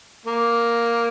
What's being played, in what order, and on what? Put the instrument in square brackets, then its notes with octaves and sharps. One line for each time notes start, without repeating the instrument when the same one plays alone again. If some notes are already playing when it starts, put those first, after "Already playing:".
[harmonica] A#3